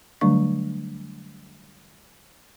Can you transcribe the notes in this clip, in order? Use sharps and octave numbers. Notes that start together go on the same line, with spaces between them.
D3 F#3 G3 A3 D4 C#6